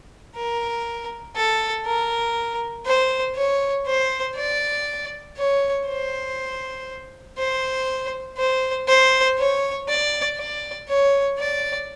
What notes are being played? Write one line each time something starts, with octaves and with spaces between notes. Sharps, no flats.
A#4
A4
A#4
C5
C#5
C5
D5
C#5
C5
C5
C5
C5
C#5
D5
D5
C#5
D5